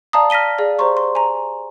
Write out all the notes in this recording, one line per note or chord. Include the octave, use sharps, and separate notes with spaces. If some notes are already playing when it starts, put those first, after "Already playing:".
D5 F5 A5 A#5 D#6
F6 A#6 B6 D#7 G7
G#4 D5 F5
G4 C5 D5 A#5 C6 C#6
C6
G#5 A#5